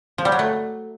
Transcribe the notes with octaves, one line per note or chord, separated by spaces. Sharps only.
F3
G3
F#3
A3